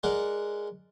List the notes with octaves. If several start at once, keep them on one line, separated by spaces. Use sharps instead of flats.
G#3 A#4 D5 F#5